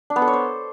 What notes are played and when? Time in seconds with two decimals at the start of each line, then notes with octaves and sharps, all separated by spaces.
0.10 D4
0.16 B3
0.22 A4
0.28 C#5
0.33 C5